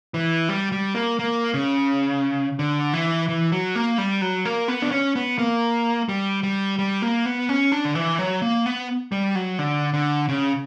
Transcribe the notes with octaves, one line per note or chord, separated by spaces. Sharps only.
E3
G3
G3
A#3
A#3
C#3
D3
E3
E3
F#3
A#3
G3
F#3
A#3
B3
D4
C#4
B3
A#3
G3
G3
G3
A#3
B3
C#4
D4
D3
E3
F#3
A#3
B3
G3
F#3
D3
D3
C#3